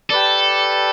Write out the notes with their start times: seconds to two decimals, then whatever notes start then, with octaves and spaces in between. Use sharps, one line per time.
0.10 G4 A4 B4 D5